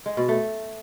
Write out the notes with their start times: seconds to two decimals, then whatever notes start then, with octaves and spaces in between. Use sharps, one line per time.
0.06 G#3
0.17 B2
0.29 A3